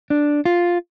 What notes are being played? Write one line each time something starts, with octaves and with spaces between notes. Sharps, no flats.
D4
F4